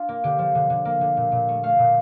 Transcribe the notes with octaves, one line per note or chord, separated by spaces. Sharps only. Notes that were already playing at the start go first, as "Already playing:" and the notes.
Already playing: D4 F4
A#3
D3 G4
F3
D3
D3
A#3
D3
A#2
A#2
A3
A3 F5
A#2